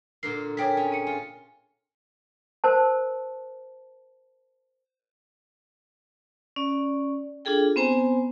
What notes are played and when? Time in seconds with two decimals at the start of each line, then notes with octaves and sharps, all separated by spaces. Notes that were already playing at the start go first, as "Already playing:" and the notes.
0.23 A#2 D3 A#4 C7
0.57 G#4 A#4 C#5 D5 G5 B6
0.77 C#4
0.92 G#5 C#7
1.07 F4
2.64 A#4 C5 A5
6.56 C#4 D5
7.45 D4 F4 G#4 A4 G5
7.76 B3 C4 C5 G#5 A#5